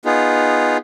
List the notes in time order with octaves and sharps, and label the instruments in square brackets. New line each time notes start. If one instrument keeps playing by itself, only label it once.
[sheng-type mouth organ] B3 D#4 F4 G#4